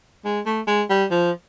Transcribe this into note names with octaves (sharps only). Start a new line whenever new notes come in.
G#3
A3
G#3
G3
F3